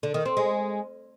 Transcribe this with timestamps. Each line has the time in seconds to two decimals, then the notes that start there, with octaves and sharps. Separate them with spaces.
0.03 D3
0.14 D#3
0.25 C4
0.37 G#3